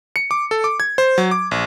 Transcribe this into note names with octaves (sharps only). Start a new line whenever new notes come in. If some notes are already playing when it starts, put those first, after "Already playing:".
C#7
D6
A4
D6
G#6
C5
F#3
D6
A#1